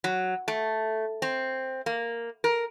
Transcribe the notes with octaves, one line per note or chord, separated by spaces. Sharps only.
F#3
A3
C4
A#3
A#4